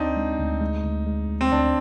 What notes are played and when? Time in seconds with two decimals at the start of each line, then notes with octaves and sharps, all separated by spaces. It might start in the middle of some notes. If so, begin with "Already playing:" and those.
Already playing: D2 C4 D4 D#4
0.16 G#3
0.39 D2
0.61 G#3
0.83 D2
1.06 G#3
1.29 D2
1.41 C4
1.51 D2 D4